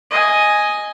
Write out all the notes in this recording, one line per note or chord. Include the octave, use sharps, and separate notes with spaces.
D#5 G#5